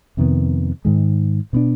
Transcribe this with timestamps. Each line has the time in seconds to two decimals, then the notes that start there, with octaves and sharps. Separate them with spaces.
0.17 F2 C3 D#3 B3
0.85 G#2 D#3 G#3
1.53 B2 B3 D4